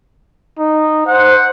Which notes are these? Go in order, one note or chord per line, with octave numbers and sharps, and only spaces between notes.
D#4
C5 F#5